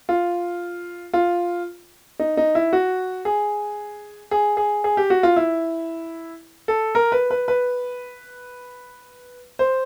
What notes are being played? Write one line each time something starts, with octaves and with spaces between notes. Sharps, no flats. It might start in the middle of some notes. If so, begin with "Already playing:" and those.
F4
F4
D#4
D#4
E4
F#4
G#4
G#4
G#4
G#4
G4
F#4
F4
E4
A4
A#4
B4
B4
B4
C5